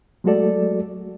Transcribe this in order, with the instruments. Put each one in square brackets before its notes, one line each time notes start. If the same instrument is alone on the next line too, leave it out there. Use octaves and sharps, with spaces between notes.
[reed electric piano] F#3 G#3 A3 F#4 A4 D5